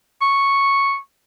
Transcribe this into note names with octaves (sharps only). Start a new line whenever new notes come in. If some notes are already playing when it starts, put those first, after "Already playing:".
C#6